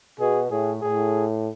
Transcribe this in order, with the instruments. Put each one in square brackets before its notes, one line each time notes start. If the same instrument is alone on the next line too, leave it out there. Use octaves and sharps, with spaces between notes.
[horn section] B2 [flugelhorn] G#4
[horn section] A2 [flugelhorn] G#4
[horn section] A2 [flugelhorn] G#4